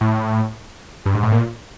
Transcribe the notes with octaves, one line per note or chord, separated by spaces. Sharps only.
A2
G2
G#2
A2
A#2